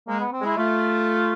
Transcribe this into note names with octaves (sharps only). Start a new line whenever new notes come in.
G#3 A#3
B3
C4
G#3
E4
A3 F4